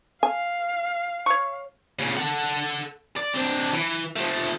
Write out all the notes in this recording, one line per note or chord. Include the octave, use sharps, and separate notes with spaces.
F5 G#5
C#5 C#6
A#2 C#3
A4 F#5
D5
C4 D4
E3
F3 A3